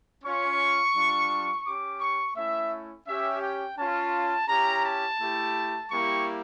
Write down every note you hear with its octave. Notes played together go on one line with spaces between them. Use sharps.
C#4 F4 C#6
G3 D4 F4
C#4 G4 D6
C#6
A3 C#4 E4 E5
C#4 G4 E5
G5
C#4 F4 A5
C#4 E4 G4 A#5
A5
A3 E4 G4
G3 A#3 E4 G4 C#6